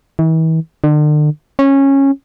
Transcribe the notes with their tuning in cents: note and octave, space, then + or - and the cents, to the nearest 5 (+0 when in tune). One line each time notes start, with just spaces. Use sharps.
E3 -40
D3 +40
C#4 -15